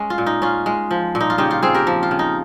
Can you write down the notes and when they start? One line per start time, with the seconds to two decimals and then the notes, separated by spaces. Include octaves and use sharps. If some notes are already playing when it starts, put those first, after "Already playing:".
Already playing: G#3 C#4
0.10 F4
0.18 A#2
0.26 D#4
0.42 C#4 F4
0.66 G#3
0.91 F3
1.15 A#2
1.21 D#4
1.30 F4
1.38 C#3 D#4 G4
1.51 F4
1.62 C4 F4 G#4
1.75 G4 A#4
1.87 F3
2.03 F4
2.11 C#3
2.19 D#4